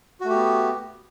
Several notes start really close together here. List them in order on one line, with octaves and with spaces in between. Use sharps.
F#4 A3 G4 B3